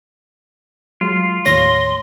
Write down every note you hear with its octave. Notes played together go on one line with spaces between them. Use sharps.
F#3 G#3 F4
D#2 A2 C#5 C6 A#6